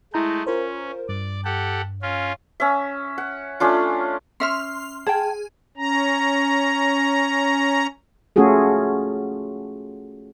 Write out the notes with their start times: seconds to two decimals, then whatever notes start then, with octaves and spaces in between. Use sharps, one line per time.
0.14 G#3 A3 E4 A#5 G6
0.47 C#4 F4 A#4 C5
1.09 G2 D5
1.44 G4 A4 F#5
2.02 C#4 F4
2.60 C#4 E5
3.18 F#5
3.60 A3 C#4 D4 F4
4.40 C#4 E5 C6 F6
5.07 G#4 G5 A5
5.77 C#4 A#5
8.36 A3 C#4 F4 F#4 G#4 A4